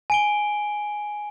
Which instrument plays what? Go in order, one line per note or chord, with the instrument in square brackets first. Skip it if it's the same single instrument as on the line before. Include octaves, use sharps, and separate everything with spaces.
[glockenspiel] G#5 D7 G7